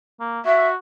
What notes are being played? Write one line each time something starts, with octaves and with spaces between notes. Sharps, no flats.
A#3
F#4 E5